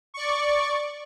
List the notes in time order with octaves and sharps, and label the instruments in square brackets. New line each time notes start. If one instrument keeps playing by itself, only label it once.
[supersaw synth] D5 C#6